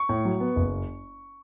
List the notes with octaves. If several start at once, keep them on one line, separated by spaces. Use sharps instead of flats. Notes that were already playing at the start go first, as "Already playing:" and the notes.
Already playing: C#6
A2
F#3
B3
F#1